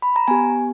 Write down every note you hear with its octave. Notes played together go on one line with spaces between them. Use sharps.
B5
A#5
B3 G4 G#5